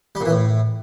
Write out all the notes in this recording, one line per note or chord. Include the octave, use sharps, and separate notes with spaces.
G3
A#2
E3
A2